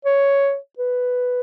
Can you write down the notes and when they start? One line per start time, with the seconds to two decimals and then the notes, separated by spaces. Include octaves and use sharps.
0.05 C#5
0.79 B4